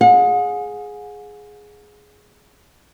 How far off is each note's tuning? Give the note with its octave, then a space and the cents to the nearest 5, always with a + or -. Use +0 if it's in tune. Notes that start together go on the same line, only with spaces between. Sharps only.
G#4 +5 F#5 -45